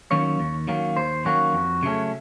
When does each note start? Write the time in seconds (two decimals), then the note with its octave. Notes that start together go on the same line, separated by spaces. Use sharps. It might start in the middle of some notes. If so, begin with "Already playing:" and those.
0.11 D#3 F#3 A#3 C#4 C#5
0.40 D#2
0.67 D#3 F#3 A#3 C#4
0.97 D#2 C5
1.25 D#3 F#3 A#3 C#4 F#4
1.54 F2
1.83 C#3 F#3 A3 C#4